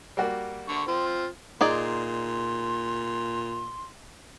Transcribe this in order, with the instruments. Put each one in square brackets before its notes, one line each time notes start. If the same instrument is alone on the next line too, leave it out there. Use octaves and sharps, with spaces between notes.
[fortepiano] G3 A#3 F#4
[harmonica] D3 C#6
C4 F4
[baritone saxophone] A#2 [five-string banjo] D#4 G#4 D5 [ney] C6